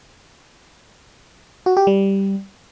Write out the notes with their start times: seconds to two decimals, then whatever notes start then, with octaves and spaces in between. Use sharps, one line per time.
1.66 F#4
1.77 G4
1.87 G3